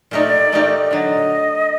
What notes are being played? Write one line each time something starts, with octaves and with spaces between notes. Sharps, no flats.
A#2 A3 D#4 G4 A#4 D5
A#2 A3 D#4 G4 A#4
D5
D3 F#3 D#5